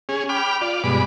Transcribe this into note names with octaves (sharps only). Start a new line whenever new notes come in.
C#4 G#4
G5 B5 D6 F6
F4 D5
G2 B2 G#3 B5 D6